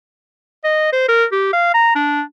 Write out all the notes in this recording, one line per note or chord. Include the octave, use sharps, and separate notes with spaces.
D#5
C5
A#4
G4
F5
A#5
D4